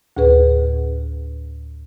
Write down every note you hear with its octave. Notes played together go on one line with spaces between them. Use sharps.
D2 A2 G#4 B4